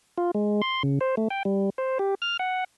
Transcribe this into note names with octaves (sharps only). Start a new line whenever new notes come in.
F4
G#3
C6
C#3
C5
A3
G5
G3
C5
G4
F6
F#5